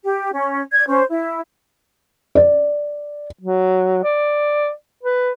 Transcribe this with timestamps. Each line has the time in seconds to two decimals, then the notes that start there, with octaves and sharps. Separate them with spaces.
0.04 G4
0.33 C#4
0.73 D5 G#6
0.88 C#4 C5
1.10 E4
2.35 D5
3.39 F#3
4.03 D5
5.03 B4